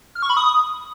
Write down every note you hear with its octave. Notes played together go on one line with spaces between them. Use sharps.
F6
C#6
B5
D#6